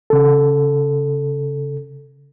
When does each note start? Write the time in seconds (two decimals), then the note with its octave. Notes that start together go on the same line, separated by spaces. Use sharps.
0.10 C#3 A4